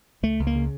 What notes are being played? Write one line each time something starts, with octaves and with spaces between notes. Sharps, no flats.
C#2 A3
C#2
A#3
C#3